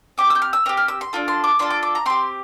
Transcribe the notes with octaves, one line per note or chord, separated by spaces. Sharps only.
C4 G4 D6
E6
G6
F6
E6
C4 G4 F6
F6
E6
C6
D4 F4 A4
C6
D6
D4 F4 A4 C6
D6
D6
A#5
C4 G4 C6